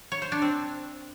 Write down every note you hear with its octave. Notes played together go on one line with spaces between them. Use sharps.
C#5
C5
D4
C4